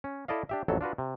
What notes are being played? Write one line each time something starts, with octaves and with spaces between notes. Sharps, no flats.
C#4
E4 A4 D5 D#5 F5
D4 G4 E5
A1 F2 F#3 A4
D4 F4 F#4 B4
C3